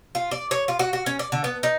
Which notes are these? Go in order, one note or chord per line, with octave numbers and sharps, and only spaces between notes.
F4
D5
C#5
F4
F#4
F#4
C#4
D5
D3
B3
D#4